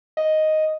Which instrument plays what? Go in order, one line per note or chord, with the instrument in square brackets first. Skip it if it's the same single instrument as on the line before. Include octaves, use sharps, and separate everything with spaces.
[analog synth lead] D#5